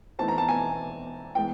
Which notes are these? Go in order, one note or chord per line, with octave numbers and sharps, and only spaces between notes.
E3 A3 C4 D#4 A5
A#5
A5
G#5
E3 G#3 B3 G5